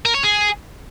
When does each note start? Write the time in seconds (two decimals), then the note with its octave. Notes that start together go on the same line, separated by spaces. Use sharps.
0.06 A#4
0.14 C#5
0.23 G#4